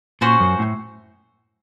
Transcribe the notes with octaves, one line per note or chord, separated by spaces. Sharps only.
A#2 C#4 F#4 C5
F#2
A2